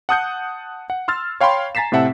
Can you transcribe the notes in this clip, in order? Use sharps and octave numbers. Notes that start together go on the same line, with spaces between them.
F#5 A5 D#6 F#6 G6 C#7
F#5
C6 E6 F6 A6
C#5 F5 G5 B5 C6
G#5 A#5 A6 B6 C7 E7
A2 C3 C4 E5 F#5 A5